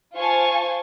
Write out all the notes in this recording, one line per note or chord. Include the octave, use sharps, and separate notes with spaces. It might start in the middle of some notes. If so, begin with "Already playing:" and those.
F4 C5 G#5 A5 C#6